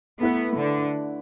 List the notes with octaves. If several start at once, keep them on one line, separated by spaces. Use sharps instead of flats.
A3 B3 E4 B4
D3